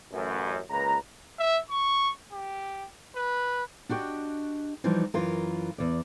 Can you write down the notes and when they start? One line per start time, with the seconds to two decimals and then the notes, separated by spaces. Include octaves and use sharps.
0.13 A1 F#2
0.70 C#2 A#2 B4 A#5
1.39 E5
1.70 C#6
2.32 G4
3.16 B4
3.89 D4 F#4 G4 D#5 G5
4.84 E3 F3 G3 D#4
5.14 F#2 E3 F4 A#4
5.78 E2 D5